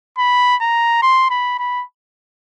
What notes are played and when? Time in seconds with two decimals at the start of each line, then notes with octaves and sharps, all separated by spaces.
0.18 B5
0.61 A#5
1.02 C6
1.30 B5
1.59 B5